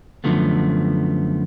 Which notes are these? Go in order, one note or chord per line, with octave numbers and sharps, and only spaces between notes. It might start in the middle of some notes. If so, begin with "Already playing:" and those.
F#2 A2 D3 F3 A3 B3